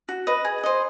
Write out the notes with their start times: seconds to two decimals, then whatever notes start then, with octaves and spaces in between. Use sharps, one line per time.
0.09 F#4
0.27 B4 D#5
0.45 G#4
0.63 C5 D#5